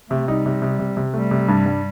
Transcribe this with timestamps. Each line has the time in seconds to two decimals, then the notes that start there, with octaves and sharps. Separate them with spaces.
0.10 C3 A3
0.28 G3 D#4
0.46 C3
0.62 C3
0.79 C3
0.97 C3
1.14 G3 A3
1.31 C3
1.48 G2
1.66 G2